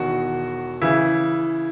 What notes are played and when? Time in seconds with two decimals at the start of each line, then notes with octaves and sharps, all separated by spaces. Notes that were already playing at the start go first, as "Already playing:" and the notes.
Already playing: E1 E2 D#3 F#4
0.82 C#3 E3 E4